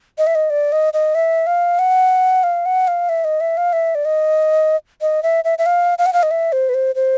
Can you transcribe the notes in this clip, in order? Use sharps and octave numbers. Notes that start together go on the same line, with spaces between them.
D#5
E5
D#5
D5
D#5
D#5
E5
F5
F#5
F5
F#5
F5
E5
D#5
E5
F5
E5
D5
D#5
D#5
E5
E5
E5
F5
F5
F#5
F5
D#5
E5
C5
B4
C5
C5